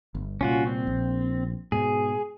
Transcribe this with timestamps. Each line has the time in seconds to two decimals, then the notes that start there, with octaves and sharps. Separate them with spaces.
0.15 G1
0.41 C2 A#2 C#4 F4 F#4
0.67 C4
0.87 A#1
1.72 G#2 B2 G#4